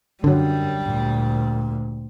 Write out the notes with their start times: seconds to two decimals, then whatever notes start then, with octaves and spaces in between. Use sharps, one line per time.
0.24 F#2 D3 F#3 G3
0.82 D2 A#2